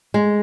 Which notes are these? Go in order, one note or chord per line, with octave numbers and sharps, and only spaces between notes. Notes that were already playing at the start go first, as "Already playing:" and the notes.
G#3